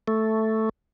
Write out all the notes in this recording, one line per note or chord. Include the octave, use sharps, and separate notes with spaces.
A3